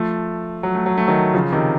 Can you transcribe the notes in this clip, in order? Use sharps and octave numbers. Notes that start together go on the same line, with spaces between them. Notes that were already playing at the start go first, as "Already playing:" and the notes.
Already playing: F3 A3
F#3
A3
F#3
A3
D#3 F#3
C#3 F3
C3 D#3